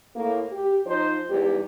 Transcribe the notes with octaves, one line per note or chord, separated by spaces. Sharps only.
A2 A#3
G4
F3 D#4 C5
E2 G#2 G3 G4